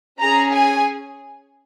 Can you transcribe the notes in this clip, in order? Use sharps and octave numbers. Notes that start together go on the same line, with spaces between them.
C#4 G#4 A#5
G#5